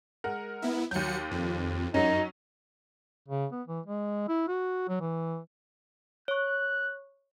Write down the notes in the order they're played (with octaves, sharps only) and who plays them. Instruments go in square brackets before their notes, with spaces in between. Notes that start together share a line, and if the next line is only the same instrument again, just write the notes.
[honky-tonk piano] G#3 A#4 F#5
[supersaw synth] B3 E4
[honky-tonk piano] D#2 G6 [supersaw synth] F#3 C#7
[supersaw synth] F2
[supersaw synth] F#2 [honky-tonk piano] F#3 C#4 [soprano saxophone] D#4
[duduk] C#3
B3
E3
G#3
E4
F#4
F#3
E3
[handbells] C#5 C#6 [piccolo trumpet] F#6